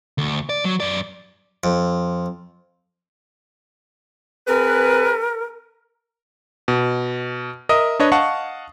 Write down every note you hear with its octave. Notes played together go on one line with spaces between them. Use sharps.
D2
D5
F#3
F#2 D5
F2
C4 G#4 A#4 B4
B2
A#4 D#5 E5 D#6
D4 B4 C#5 D#5
D#5 F5 F#5 A5 C#6